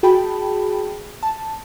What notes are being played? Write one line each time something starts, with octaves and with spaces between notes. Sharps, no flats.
F#4 G#4 G5 A5 B5
A5